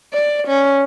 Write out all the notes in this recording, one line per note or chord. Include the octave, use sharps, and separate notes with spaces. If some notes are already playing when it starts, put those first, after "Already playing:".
D5
C#4